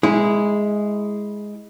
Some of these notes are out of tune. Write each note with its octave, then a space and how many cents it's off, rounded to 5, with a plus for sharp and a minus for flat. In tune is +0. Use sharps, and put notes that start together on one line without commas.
G#3 +0 E4 -15